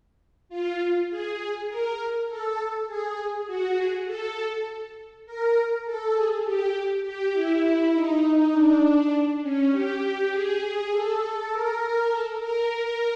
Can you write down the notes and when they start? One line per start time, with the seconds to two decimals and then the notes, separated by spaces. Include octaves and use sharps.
0.49 F4
1.09 G#4
1.39 G#4
1.68 A#4
2.28 A4
2.87 G#4
3.47 F#4
3.77 G#4
4.06 A4
5.26 A#4
5.85 A4
6.15 G#4
6.45 G4
7.04 G4
7.33 E4
7.93 D#4
8.52 D4
9.42 C#4
9.71 G4
10.31 G#4
10.91 A4
11.51 A#4
12.10 A4
12.39 A#4